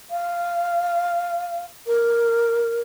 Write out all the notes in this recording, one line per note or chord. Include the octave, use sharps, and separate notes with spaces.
F5
A#4